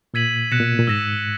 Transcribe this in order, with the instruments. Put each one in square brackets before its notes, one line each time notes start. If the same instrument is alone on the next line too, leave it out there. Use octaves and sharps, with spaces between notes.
[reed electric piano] A#2 [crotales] E6 G#6 B6 D#7 F#7
[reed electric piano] B2 [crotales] F#6 A#6 C#7 E7
[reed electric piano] A#2
A#2
[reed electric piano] G#2 [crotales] E6 A#6 E7